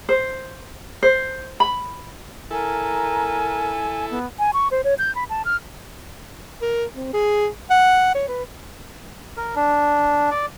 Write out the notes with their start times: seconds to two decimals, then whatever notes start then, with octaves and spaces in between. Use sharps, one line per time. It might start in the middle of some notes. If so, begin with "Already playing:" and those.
0.09 C5
1.03 C5
1.60 B5
2.51 E4 A4 A#4 G#5
4.10 B3
4.39 G#5
4.53 C#6
4.71 C5
4.84 C#5
4.99 G6
5.15 B5
5.30 A5
5.45 F6
6.62 A#4
6.95 C4
7.14 G#4
7.70 F#5
8.15 C#5
8.28 B4
9.37 A#4
9.55 D4
10.31 D5